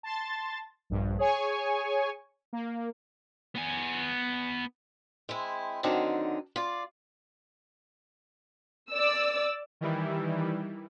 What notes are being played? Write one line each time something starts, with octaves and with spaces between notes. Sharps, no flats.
A5 C6 A6
A#1 G2
G#4 C#5 G#5 C#6
A#3
B3 G#5
G#3 C4 E4
D3 D#3 F#3 C4 D4 D#4
F4 D5
D5 E6
D#3 E3 G3 E4